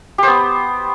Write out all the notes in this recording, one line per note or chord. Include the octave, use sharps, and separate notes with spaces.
B3 G4 C5